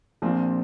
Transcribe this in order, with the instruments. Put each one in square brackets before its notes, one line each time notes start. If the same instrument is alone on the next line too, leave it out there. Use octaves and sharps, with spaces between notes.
[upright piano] A#1 A#2 F3 C4